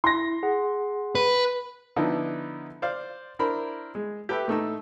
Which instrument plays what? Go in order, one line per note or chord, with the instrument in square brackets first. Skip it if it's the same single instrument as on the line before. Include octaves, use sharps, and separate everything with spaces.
[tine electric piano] E4 [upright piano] C6 A#6
[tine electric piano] G#4 F#5
[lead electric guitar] B4
[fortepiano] D3 F3 B3 D#4 E4
C5 D5 F5
D4 E4 A#4 C5 B5
G#3
G4 A4 B4 E5 G5
A2 A3 D#4 E6